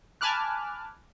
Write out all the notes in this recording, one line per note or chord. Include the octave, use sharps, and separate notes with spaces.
G#5 A5 B5 D6 F6 F#6